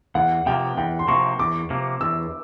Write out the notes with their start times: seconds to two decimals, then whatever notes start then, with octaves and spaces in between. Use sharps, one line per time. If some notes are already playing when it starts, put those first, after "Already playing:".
0.15 E2 F#5
0.46 C3 F3 A#3 G5
0.77 E2 G5
0.99 C6
1.08 C3 F3 A#3 C#6
1.39 E2 D6
1.70 C3 F3 A#3
2.01 E2 E6